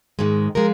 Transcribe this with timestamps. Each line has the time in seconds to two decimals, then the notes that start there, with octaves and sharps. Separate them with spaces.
0.19 G#2 D#3 G#3
0.55 F3 G#3 A#4